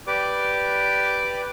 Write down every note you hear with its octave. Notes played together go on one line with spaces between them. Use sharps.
G4 B4 D5 D6